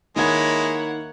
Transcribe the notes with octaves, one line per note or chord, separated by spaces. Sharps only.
D#3 G#3 A#3 E4 C#5 F#5 G#6